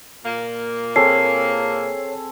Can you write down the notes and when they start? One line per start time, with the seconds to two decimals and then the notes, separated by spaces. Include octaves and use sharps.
0.25 A#2 A#3
0.96 C4 G#4 A4 C#5 C7